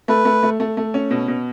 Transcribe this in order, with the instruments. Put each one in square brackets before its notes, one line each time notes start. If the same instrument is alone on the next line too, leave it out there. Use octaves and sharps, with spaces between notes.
[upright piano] A3 [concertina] B4
[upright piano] A3
A3
A3
A3
C#4
B2
B2